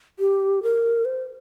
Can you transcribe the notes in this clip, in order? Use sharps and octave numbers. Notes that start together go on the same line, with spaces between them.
G4
A#4
C5